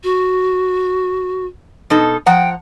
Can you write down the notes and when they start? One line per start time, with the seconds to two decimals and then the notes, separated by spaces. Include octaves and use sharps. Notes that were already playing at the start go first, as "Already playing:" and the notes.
0.04 F#4
1.90 B2 D#4 A4
2.26 F3 F#5 G5 A#5